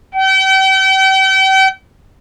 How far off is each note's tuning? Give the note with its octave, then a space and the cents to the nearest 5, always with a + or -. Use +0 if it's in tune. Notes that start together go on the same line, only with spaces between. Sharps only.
G5 -40